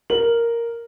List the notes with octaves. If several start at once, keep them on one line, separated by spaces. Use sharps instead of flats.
A#4 F#7